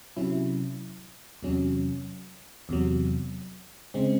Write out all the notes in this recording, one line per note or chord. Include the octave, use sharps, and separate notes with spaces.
C3 F#3 C#4 E4
E2 C3 F#3 C#4
E2 C3 F#3
C#3 G#3 C4